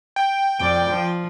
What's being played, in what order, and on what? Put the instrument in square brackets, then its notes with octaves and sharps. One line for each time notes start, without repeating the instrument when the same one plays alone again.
[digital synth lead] G5
[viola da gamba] F2 D5 [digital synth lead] G5
[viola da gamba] F3